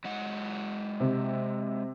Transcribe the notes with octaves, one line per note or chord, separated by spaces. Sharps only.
F#3 G#3 F#5
C3